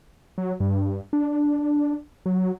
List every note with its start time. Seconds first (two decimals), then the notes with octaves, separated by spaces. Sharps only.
0.38 F#3
0.60 G2
1.13 D4
2.26 F#3